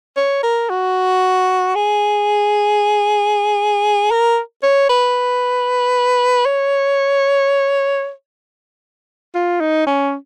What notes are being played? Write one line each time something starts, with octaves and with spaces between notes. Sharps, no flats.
C#5
A#4
F#4
G#4
A#4
C#5
B4
C#5
F4
D#4
C#4